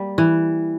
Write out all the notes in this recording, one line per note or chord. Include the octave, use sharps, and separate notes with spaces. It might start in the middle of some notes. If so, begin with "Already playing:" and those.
Already playing: G3 A#3
E3